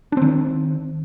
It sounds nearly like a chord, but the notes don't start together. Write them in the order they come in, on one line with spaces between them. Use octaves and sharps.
D4 C4 D#3